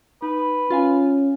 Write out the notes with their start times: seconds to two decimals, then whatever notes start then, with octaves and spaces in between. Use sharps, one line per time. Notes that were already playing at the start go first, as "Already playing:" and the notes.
0.22 D#4 B4
0.70 C#4 F4 F5 G#5